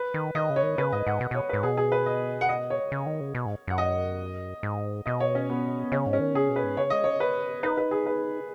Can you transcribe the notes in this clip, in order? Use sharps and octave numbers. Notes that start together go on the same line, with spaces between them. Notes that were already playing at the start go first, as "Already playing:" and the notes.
Already playing: B4
D#3
D#3 D#5
C#3
C#5
D#3
C#3 B4
G#2 D#5
G#2 F#5
B2
B2 C#5
G#2 B4
B2 G#4
G#4
B4
D#5
F#5
D#5
C#5
C#3
D#3
C#3
B2
G#2
F#2 F#5
D#5
G#2
B2 D#5
C#5
C#4
B3
C#3 C#4
G#2
C#4
D#3
C#3 G#4
B2
B4
G#2
C#3 C#5
G#3 D#5
C#4 C#5
B4
D#4 B4
B4
G#4
B4